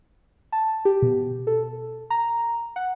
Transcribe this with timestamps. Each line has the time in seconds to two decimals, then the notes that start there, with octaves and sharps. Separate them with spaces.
0.52 A5
0.85 G4
1.02 B2
1.47 A4
2.10 A#5
2.76 F#5